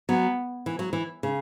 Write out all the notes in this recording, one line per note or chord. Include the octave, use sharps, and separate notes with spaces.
F#3 B3
E3
F#3
E3
C#3